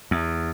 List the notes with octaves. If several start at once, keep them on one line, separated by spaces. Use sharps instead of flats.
E2